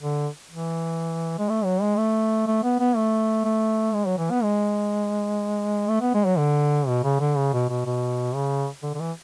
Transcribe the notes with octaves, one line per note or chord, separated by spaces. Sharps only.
D3
E3
G#3
A3
F#3
G#3
A3
A3
B3
B3
A3
A3
G#3
F#3
E3
B3
G#3
A3
B3
G#3
F#3
D3
B2
C#3
D3
C#3
B2
B2
B2
C#3
D3
D3
E3